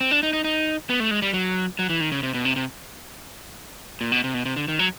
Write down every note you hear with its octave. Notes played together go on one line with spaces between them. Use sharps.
C4
D4
D#4
D#4
D#4
B3
A3
G#3
G3
F#3
F#3
E3
D#3
C#3
C3
B2
C3
C3
A#2
B2
C3
B2
C3
D3
D#3
F#3